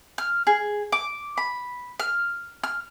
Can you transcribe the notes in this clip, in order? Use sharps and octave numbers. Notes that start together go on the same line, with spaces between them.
F6
G#4
D6
B5
F6
F6